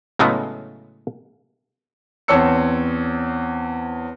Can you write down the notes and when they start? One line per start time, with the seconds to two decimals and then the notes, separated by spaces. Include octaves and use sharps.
0.19 A2 C#3 F#3 G#3 A3 B3
2.28 E2 C4 C#5 A5 E6 C#7